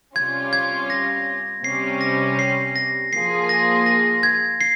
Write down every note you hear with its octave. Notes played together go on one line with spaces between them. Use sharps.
C3 G3 C#4 F4 G#6
G#6
A#6
C3 G3 C#4 C7
A#6
C7
A#6
F3 A#3 F4 G#4 C7
A#6
A#6
G#6
C7